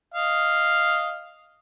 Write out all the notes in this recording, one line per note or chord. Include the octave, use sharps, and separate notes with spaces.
D#5 F5